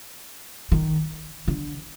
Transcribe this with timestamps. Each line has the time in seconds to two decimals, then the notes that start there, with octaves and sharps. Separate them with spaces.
0.72 D#3
1.48 D3